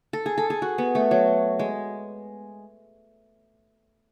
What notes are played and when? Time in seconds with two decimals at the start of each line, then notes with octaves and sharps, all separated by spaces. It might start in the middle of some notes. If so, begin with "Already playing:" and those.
0.13 A4
0.26 G#4
0.38 A4
0.50 G#4
0.62 F#4
0.78 B3
0.95 A3
1.11 F#3
1.59 G#3